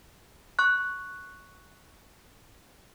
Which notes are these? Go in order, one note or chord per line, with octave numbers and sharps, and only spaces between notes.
C#6 F#6